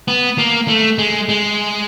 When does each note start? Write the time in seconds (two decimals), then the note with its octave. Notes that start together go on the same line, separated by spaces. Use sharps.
0.08 B3
0.38 A#3
0.68 A3
0.98 G#3
1.29 G#3